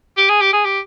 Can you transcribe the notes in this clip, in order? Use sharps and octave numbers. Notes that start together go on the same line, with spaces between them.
G4
G#4
G4
G#4
G4